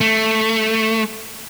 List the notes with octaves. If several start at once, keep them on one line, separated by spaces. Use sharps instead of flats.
A3